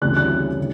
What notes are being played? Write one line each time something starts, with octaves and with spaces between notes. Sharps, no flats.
D2 C#3 E3 G3 C4 F#6
F#6
D3